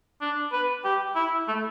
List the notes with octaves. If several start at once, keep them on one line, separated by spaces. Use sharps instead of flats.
D4
B4
G4
E4
A3